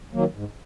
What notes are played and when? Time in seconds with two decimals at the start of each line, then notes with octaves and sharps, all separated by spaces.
0.13 D#3 F#3 A#3
0.34 G#2